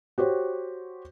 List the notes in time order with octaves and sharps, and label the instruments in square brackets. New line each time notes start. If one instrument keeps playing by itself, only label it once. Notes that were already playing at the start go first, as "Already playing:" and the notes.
[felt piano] F#4 G4 C5 C#5